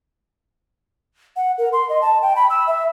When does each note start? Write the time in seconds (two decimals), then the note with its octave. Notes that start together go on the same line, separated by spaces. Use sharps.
1.36 F#5
1.58 A#4
1.73 C6
1.89 D#5
2.02 A5
2.22 G5
2.36 B5
2.50 E6
2.67 E5